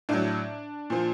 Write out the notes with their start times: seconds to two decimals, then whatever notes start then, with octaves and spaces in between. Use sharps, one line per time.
0.09 A2 F#3 D4
0.90 A#2 F3